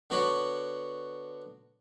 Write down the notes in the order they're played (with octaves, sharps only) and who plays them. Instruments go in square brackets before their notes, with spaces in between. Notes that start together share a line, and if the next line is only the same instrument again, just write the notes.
[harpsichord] D3 B3 F#4 C#5 D5 B5